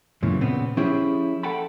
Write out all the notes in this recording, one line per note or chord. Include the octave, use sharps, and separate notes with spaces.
F#2 A#2 C#3 E3
A#2 C#3 B3 C4
F3 C#4 E4 G4 G#4 C5
A4 F#5 G5 A5 B5